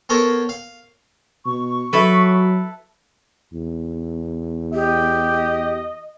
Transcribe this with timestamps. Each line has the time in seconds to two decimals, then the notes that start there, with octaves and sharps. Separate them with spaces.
0.09 B3 A4 A#4 C5 C#5
0.49 F5
1.46 B2 C#6
1.93 F#3 E4 A4 B4
3.54 E2
4.74 G4 D#5